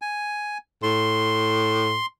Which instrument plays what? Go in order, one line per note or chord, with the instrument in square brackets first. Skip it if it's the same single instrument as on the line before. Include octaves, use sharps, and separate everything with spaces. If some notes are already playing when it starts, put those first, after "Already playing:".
[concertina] G#5
[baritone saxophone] A2 [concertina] C6